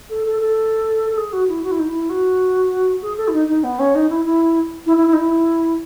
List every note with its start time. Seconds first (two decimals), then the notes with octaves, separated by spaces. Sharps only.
0.09 A4
0.24 A4
0.39 A4
1.09 A4
1.17 G#4
1.32 F#4
1.48 E4
1.63 F#4
1.71 E4
1.79 D#4
1.87 E4
2.09 F#4
3.01 G#4
3.17 A4
3.27 E4
3.32 D#4
3.47 D#4
3.63 B3
3.79 C#4
3.94 D#4
4.09 E4
4.24 E4
4.86 E4
4.96 E4
5.06 E4
5.12 D#4
5.17 E4